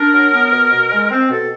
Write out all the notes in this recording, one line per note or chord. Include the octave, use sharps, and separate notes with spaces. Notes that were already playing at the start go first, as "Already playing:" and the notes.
Already playing: D4 A#4
F#3
B3
B2
B2
G#3
C4
B2 A4